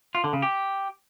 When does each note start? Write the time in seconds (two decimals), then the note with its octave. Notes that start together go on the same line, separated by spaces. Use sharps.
0.15 F4
0.24 D3
0.33 C#3
0.42 G4